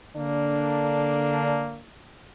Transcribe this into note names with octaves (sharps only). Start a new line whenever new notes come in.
D3 A#3 D4